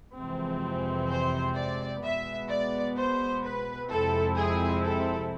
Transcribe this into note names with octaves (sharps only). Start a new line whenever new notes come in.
F2 C3 E3 G#3 C4
C5
D5
B2 G#3 B3 E5
D5
C5
B4
F2 C3 G#3 C4 E4 A4
G#4
A4